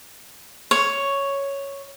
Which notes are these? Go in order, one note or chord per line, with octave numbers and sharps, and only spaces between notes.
C#5